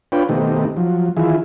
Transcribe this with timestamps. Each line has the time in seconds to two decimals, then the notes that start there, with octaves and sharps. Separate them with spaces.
0.12 D4 F4 B4 C#5 G5
0.29 B2 D#3 A3 C4 D#4 G4
0.77 F3 F#3
1.17 D#3 E3 E4 F4 G#4